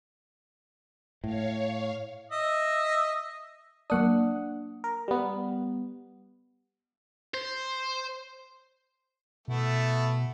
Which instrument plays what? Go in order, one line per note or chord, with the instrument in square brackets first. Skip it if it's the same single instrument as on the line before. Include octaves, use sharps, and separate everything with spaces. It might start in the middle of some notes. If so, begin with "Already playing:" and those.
[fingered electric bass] A2 [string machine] C#5 F5
[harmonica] D#5 E5
[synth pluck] F#3 A#3 D#6 [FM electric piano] D4 F#5
[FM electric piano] A#4
G3 B3
[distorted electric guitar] C5
[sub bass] B2 [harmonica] A3 B3 E4